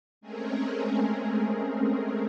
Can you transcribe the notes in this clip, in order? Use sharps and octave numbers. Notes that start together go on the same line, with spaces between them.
G#3 A3 C4 C#4 G#4 A#4